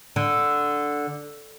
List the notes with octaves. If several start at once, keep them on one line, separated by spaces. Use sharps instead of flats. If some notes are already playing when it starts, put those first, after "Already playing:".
D3